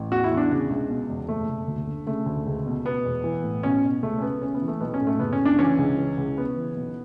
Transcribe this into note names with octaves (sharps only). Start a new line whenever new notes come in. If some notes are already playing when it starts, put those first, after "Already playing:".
Already playing: A1
E2 F#4
E4
E2
D4
C#3
C#2
B2
E1
F#1 A3
F#1
D2
D3
C#3 A3
D2
C#2
B2
B2 B3
E1
E3
A2
B2 C#4
B2
C#2 A3
C#4
B2 B3
C#3 C#4
B3
E3
A3
B1 B3
C#4
A2
A3
F#1 B3
C#4
F#1
D4
E3 C#4
C#2
E3
C#2
C#3 B3
E3
B1